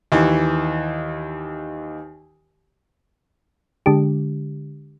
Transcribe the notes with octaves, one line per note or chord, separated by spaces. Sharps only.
D#2 E3
D3 G#3 D4 G4